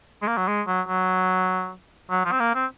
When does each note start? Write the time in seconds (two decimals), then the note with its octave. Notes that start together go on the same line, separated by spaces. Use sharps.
0.22 G#3
0.28 A#3
0.37 F#3
0.48 G#3
0.67 F#3
0.88 F#3
2.10 F#3
2.25 F3
2.32 C4
2.40 A#3
2.55 C4